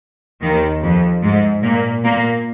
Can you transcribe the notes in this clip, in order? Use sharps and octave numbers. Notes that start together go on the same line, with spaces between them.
D#2 D#3
F2 F3
G#2 G#3
A#2 A#3
A#2 A#3